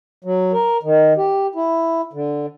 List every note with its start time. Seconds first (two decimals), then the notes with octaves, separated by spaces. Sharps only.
0.24 F#3
0.53 A#4
0.83 D#3
1.17 G4
1.55 E4
2.13 D3